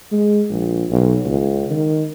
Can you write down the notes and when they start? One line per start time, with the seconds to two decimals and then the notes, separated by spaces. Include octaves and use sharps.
0.12 G#3
0.50 A#1
0.90 B1
1.25 C#2
1.70 D#3